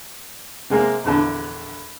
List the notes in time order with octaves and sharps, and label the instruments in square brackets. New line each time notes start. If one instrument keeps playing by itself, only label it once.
[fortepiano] C3 G#3 A#3
A#1 E2 D3 A5